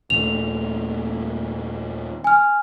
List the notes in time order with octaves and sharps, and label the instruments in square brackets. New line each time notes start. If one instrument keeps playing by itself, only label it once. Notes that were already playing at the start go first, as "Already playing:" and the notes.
[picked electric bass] D#2 A#2 A3 [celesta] F7
[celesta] G#5 F6